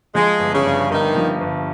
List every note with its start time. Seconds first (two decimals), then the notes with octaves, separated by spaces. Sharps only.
0.15 F3 G#3
0.40 G1
0.53 C#3
0.66 G2
0.90 G1 D#3
1.16 F3
1.41 G1